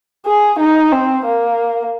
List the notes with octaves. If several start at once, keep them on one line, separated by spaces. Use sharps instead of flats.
G#4
D#4
C4
A#3